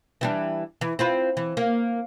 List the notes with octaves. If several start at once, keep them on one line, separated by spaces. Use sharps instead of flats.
E3 G3 D4
E3
C4 F4 B4
E3
A#3